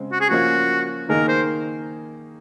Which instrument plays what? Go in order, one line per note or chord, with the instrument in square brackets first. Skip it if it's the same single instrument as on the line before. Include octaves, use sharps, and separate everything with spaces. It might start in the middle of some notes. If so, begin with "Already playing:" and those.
Already playing: [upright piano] C#3 G#3 C4
[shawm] F#4
G#4
[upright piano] F3 A#3 C#4 F4 [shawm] F#4
[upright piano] D#3 A#3 D#4 G#4 [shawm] A#4
[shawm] C5